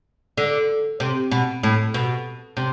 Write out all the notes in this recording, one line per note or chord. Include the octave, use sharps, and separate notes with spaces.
D3
C3
B2
A2
B2
C3